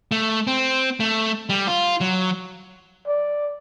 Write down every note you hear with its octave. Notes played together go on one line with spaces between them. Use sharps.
A3
C4
A3
G3
F4
F#3
D5